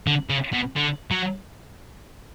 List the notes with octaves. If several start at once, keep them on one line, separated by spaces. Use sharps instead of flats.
D3
C#3
B2
D3
F#3